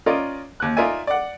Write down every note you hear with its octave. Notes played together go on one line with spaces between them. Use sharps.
C#4 F4 A#4 D5 D#5
D#2 F#6
D#4 F4 A#4 D5 E5 G#5
D5 F#5